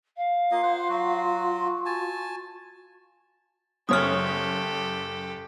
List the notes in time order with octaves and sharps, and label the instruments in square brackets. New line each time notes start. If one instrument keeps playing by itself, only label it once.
[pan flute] F5
[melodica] A#3 D#5 [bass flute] F4
[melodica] C5 F#5
F#3 F#4
[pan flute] F#4 [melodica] G#5 A5
[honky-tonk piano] F#1 F#2 C#5 [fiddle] G4 A4 [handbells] D#6 F6